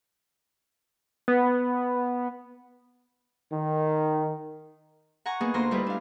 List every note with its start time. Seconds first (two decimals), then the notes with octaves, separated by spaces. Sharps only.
1.28 B3
3.52 D#3
5.26 F#5 G#5 A#5 C#6
5.41 A#3 B3 D#4 G#4
5.54 D2 A#3 F4 A#5 C6
5.71 G3 A3 D#4 E4 G4 B4
5.87 D4 F5